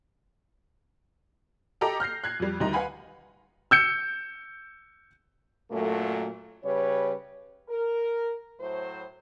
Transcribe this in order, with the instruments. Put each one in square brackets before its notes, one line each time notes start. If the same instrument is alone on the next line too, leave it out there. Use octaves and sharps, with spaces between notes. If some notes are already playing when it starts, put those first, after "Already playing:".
[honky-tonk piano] G4 A4 D#5 A5 A#5 D6
F6 G6 A#6 C7
F#6 G#6 C7
F2 G3
D2 D#3 G3 D#5 A#5
B4 F5 F#5 G#5 B5
[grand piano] E6 G6 C#7
[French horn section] F#2 A#2 F#3 A3
C#3 G3 B4 C#5
A#4
A2 F#3 C5